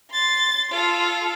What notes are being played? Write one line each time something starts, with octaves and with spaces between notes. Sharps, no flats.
C6 A6
F4 A4